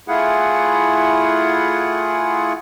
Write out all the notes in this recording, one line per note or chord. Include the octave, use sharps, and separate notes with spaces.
A3 E4 F4 G#4 F#5